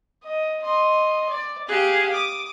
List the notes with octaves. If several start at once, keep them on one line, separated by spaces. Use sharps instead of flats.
D#5
D#5 C6
D5
G4 G#4 F5 F#6
D6 D#6